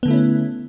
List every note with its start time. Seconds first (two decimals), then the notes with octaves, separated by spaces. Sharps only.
0.03 B3
0.05 D3
0.08 A3
0.10 E4
0.13 C#4